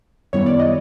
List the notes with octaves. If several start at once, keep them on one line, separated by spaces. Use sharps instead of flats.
F#2 D#3 G3 B3 E4 C#5
D5
D#5